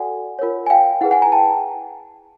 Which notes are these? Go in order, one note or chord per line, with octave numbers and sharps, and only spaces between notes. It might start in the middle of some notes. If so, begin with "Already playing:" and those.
Already playing: F#4 A4 D5 F#5 G#5
F4 A#4 C#5
G#5
F5 G5
E4 G#4 B4 F#5
F#5 G#5
G#5 A#5
G5 A5